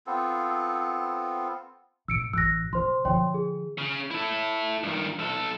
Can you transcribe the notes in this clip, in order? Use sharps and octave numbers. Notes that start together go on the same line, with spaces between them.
B3 C4 F4 A4
A2 E6 C#7 D7
A1 E6 F#6 A#6
C#3 C5 C6
D3 F3 C#5 G5 C6
G#4
C#3
E4 A4
G2 D#3
B1 A4